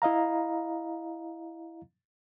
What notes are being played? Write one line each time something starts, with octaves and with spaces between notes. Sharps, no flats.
E4 D#5 F5 A#5